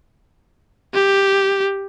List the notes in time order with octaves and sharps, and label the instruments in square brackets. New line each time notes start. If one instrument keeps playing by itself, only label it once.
[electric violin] G4